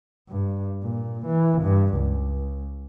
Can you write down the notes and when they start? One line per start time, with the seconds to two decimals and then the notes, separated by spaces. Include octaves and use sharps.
0.29 G2
0.83 A#2
1.26 E3
1.62 G2
1.96 C#2